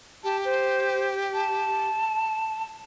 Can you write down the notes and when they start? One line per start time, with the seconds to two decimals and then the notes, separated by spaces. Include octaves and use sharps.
0.24 G4 A5
0.45 C5
1.34 A5